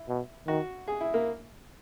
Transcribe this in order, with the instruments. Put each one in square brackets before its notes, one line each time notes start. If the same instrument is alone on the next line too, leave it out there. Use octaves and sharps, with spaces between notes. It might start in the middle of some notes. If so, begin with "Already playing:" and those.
Already playing: [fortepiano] E4
[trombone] B2
[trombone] D#3 [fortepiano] F#4
[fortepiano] G#4
E4
A#3